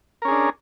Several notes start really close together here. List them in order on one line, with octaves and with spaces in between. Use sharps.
A#4 C#4 G#4 D4